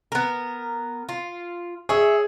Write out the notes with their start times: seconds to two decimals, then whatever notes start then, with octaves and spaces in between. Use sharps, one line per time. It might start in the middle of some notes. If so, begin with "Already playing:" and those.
0.12 B3 A#4
1.09 F4
1.89 G#4 C#5 E5